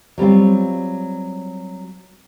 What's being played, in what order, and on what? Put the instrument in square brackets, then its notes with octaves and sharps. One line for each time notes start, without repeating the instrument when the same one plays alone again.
[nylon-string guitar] F#3 G3 C4 F4